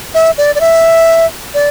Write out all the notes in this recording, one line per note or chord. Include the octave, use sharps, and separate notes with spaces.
E5
D5
D5
E5
D5